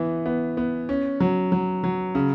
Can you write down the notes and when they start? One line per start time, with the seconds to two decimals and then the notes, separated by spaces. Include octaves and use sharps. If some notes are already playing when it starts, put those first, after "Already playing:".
Already playing: E3 B3
0.26 B3
0.57 B3
0.89 C#4
1.20 F#3
1.52 F#3
1.84 F#3
2.15 C#3